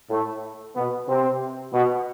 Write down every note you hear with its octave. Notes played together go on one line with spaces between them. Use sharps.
A2 A3
B2 B3
C3 C4
B2 B3